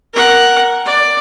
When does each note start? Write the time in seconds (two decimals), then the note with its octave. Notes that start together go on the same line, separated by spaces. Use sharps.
0.14 A#4 F#5
0.86 D5